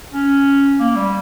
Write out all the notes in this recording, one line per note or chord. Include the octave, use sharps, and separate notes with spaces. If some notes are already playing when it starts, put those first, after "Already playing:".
C#4
A#3
G3